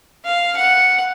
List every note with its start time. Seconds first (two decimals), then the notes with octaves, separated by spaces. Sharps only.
0.25 F5
0.57 F#5